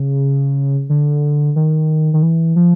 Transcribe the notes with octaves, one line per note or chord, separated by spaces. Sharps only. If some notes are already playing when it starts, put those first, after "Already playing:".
Already playing: C#3
D3
D#3
D#3
E3
F3